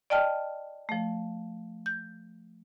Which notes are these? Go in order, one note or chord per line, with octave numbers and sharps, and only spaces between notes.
D5 D#5 G5 A5 F6
F3 A3
G6